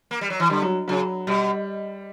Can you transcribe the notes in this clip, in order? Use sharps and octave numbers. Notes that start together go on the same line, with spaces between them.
A#3
G3
F#3
E3
D3 G3
F#3
C#3 F#3
B2 G3